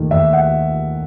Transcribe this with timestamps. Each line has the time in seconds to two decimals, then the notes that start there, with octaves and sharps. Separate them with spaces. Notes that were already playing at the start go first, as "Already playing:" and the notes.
Already playing: D#2 D#3 A3
0.11 D#2 E5
0.33 F#5